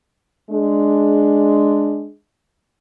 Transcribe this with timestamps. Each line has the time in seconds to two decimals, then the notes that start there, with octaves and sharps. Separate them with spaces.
0.51 G#3 D4